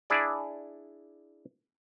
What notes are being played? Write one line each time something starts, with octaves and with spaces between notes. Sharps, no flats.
D4 E4 G#4 D5